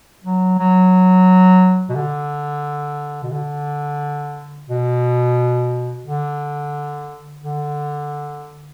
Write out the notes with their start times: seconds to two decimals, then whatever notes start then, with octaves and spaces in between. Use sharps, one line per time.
0.24 F#3
0.58 F#3
1.89 B2
1.95 D3
3.23 B2
3.32 D3
4.69 B2
6.06 D3
7.43 D3